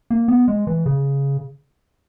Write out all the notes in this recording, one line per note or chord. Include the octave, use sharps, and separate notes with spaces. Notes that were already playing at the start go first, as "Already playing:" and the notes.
A#3
B3
G#3
E3
C#3